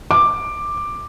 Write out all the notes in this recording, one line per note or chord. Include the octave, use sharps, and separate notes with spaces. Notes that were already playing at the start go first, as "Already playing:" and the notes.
D6